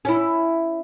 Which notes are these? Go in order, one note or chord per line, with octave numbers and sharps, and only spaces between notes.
C#4 E4